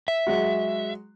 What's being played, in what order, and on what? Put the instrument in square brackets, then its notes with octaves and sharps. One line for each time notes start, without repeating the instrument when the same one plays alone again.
[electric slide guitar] E5
[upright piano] F#3 G#3 F#4